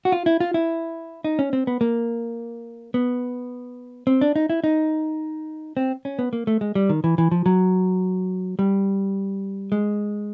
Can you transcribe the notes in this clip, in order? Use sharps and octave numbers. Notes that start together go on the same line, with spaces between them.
F#4
F4
E4
F4
E4
D#4
C#4
C4
B3
A#3
B3
C4
D4
D#4
E4
D#4
C4
C#4
B3
A#3
A3
G#3
G3
D#3
E3
E3
F3
F#3
G3
G#3